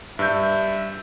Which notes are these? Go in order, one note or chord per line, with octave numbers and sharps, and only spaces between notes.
G2 E5 G6